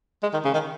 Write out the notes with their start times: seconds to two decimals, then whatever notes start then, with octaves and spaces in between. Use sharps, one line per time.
0.23 G#3
0.33 D#3
0.44 C#3
0.54 D#3